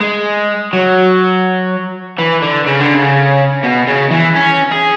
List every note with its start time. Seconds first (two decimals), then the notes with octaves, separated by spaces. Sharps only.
0.01 G#3
0.73 F#3
2.18 E3
2.42 D3
2.66 C#3
2.80 D3
2.94 C#3
3.63 B2
3.87 C#3
4.11 E3
4.35 C#4
4.72 G#4